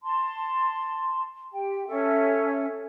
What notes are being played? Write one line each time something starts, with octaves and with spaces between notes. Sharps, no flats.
A5 C6
G4 G5
C#4 A4 E5